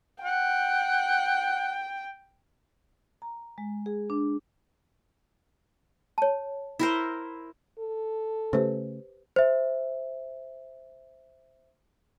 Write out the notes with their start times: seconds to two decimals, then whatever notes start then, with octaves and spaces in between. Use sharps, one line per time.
0.24 F#5 G5
3.22 A#5
3.58 G#3
3.86 G#4
4.10 D4
6.18 C#5 A5
6.79 E4 A#4 C5
7.79 A4
8.53 C#3 A3 G4 B4 C5
9.36 C5 E5